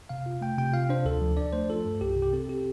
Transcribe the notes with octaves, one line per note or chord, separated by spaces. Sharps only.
C3 F5
F4
A3 G5
C3 G5
F4 F5
D4 C5
D2 A4
F3
D4 D5
A3 C5
F4 A4
G2
C2 G4
C3
G4
C4 A4
C4 G4